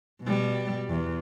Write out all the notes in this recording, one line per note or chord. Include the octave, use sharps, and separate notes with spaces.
B2 G3
E2